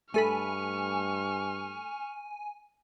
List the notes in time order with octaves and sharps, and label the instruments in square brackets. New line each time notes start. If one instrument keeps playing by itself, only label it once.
[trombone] G2 [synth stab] A3 A4 B5 [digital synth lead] G#5 [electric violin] C#6 F6